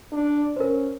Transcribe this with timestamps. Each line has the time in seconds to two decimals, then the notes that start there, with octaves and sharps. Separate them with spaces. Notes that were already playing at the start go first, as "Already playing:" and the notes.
0.12 D4
0.56 C#4 A#4 C5